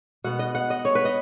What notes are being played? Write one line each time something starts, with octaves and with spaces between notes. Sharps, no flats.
B2 B3 F#5
D#5
F#5
D#5
C#5
B4
D#5